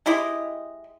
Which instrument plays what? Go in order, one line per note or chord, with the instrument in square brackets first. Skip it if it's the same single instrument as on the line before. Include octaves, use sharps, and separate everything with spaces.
[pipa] G#3 E4 G4 D#5